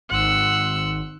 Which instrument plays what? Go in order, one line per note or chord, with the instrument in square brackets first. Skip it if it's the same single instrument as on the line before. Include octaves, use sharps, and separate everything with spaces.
[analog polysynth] G#1 [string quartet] F#5 C6 E6